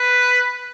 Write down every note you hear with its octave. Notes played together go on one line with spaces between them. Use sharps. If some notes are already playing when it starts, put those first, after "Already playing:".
Already playing: B4